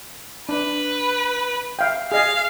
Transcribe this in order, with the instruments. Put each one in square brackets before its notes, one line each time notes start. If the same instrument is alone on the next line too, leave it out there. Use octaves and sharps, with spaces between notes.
[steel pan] D4 [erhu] B4
[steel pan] E5 F5 G5
[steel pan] G#4 D#5 G#5 [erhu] F5